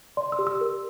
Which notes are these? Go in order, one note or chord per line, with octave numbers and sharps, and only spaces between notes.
D5 C6
E6
G4
E6
A#4